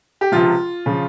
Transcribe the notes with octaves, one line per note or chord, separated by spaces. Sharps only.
G4
C#2 C3 F3 F4
C#3 F3